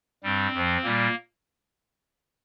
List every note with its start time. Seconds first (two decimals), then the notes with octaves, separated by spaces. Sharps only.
0.23 G2 G3 C4
0.53 F2 F3
0.83 A#2 G3 A#3